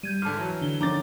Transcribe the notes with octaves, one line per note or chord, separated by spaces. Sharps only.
G3 G6 G#6 D#7
G#2 D3 A5 F6
E3 F#3
D3 D4 G7
D3 D#3 F3 C#4 D#4 A#5 D6 A6